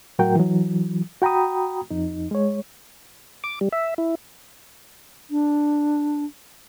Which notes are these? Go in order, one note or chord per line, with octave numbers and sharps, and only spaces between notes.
A2 F#3 F#4 A#4 G5
E3 F#3
F#4 G5 A#5 B5 D#6
F2 D#4
G#3 C#5
D6
G3
E5
E4
D4